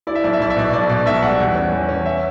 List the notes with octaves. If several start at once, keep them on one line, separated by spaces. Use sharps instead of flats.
E4 D5
E5
B1 D5
E5
B1 D5
E5
B2 D5
B1 D5
B2 D5
B1 E5
G3 F#5
E2
C#4
E2
C#4
E5